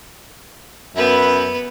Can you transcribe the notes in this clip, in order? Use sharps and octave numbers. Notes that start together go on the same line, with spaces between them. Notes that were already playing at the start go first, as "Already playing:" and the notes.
F#2 B3 B4 E5